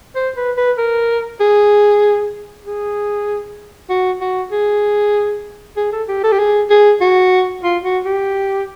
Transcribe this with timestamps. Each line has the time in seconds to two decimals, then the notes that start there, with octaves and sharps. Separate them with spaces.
0.16 C5
0.36 B4
0.57 B4
0.78 A#4
1.40 G#4
2.65 G#4
3.90 F#4
4.21 F#4
4.52 G#4
5.77 G#4
5.92 A4
6.08 G4
6.24 A4
6.32 G4
6.39 G#4
6.70 G#4
7.01 F#4
7.63 F4
7.84 F#4
8.05 G4